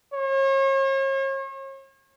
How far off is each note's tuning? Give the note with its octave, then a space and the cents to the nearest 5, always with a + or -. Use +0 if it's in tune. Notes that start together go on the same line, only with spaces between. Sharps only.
C#5 -40